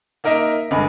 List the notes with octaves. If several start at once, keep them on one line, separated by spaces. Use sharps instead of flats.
A#3 D#4 A#4 D#5 E5
G1 G2 G#3 B5